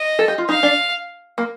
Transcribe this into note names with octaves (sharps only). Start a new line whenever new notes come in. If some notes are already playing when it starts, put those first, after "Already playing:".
Already playing: D#5
A4
G4
F4
D#4 F5
D4
A#3